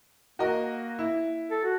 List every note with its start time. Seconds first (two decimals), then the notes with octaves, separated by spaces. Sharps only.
0.39 A#3 F#4 A#4 D#5
0.99 E4
1.51 A4
1.64 F#4